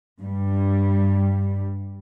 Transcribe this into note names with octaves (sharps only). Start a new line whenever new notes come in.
G2 G3